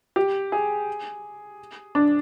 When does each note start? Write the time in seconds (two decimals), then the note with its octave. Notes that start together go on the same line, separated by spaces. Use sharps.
0.16 G4
0.52 G#4
1.95 D4